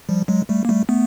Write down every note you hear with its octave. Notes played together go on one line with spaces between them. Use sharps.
F3 G3
F#3 G#3
G3 A3
A#3
G3 A3
A3 B3